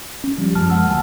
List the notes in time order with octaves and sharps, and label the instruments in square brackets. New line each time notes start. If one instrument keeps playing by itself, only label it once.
[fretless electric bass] C#4
F3 G3
[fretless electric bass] F#2 F3 G#3 [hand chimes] A5 F6
[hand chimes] A#3 F#5 E6
[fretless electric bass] D2 [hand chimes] G#5 A5